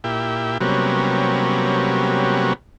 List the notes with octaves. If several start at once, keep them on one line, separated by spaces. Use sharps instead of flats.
A#2 E4 G4
C3 F#3 G3 A#3 B3 C#4